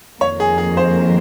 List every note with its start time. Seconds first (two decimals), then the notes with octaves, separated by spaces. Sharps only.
0.20 F2 D#3 A#3 C#5
0.40 G#4
0.58 G#4
0.77 C5